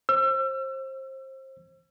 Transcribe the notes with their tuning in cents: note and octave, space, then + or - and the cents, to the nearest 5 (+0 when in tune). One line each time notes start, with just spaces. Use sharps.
C5 +25 E6 +35